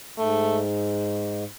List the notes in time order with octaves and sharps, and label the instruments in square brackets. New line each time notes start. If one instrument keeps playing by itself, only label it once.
[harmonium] G#2 [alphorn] A3